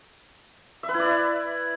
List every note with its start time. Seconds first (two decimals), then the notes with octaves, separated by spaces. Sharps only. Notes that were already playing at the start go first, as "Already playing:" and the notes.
0.83 E5
0.89 B4
0.94 E4
1.00 D5
1.05 E5